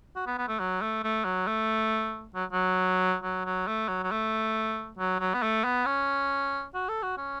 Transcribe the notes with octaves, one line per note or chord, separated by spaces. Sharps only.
F#4
B3
B3
A3
F#3
A3
A3
F#3
A3
F#3
F#3
F#3
F#3
A3
F#3
F#3
A3
F#3
F#3
B3
A3
B3
C#4
F#4
A4
F#4
C#4